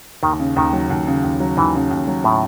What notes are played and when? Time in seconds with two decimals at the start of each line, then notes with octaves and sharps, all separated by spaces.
0.23 D#2 D#3
0.40 C#3
0.56 D#2 D#3
0.73 F#3
0.90 D#2
1.07 C#3
1.24 D#2
1.40 F#3
1.57 D#2 E3
1.75 C#3
1.91 D#2
2.08 F#3
2.24 A2